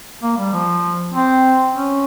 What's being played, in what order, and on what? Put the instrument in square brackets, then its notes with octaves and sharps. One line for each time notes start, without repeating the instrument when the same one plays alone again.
[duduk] A#3
G3
F3
C4
C#4